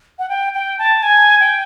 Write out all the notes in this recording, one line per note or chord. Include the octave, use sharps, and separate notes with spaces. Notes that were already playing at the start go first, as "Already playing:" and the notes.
F#5
G5
G5
A5
G#5
G5